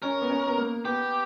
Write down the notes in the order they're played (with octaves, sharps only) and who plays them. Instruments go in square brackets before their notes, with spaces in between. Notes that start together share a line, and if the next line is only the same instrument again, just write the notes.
[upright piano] C#4 [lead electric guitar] A#4
[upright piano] B3
C#4
B3
A#3
[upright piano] B3 [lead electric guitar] G4